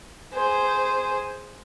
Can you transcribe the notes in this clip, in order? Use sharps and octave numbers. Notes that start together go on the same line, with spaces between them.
G#4 C5